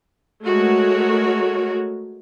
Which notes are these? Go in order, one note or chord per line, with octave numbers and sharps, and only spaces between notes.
G#3 A3 F#4 A#4 C#5